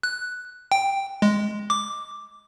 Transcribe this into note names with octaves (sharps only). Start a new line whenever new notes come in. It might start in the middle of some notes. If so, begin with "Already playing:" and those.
F#6
G5
G#3
D6